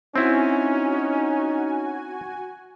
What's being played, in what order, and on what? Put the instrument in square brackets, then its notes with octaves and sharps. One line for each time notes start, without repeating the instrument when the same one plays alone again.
[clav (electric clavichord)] C4 E4 [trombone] C#4 [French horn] D#4 [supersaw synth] F#4 G#5